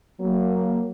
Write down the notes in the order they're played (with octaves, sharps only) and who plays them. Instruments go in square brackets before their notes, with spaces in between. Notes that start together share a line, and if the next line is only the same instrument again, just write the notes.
[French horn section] F#3 A#3